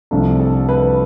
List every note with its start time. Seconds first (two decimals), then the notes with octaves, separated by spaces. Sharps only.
0.11 C2 C3 F3 A3 D4 A4
0.40 A4
0.69 B4